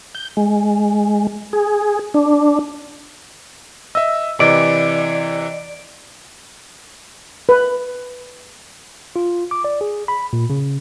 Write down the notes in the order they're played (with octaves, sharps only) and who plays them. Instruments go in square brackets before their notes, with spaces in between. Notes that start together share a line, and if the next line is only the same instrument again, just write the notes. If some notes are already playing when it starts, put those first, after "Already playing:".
[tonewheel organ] G6
G#3
G#4
D4
[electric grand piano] D#5 E5 [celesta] E6
[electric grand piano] C3 E3 [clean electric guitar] D5 [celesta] D#5 [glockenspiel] D7
[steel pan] B4
[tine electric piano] F4
D6
D5
G#4
B5
A#2
C#3